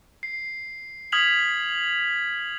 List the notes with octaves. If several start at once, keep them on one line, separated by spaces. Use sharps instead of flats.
C7
D#6 F6 G#6 B6 F7 F#7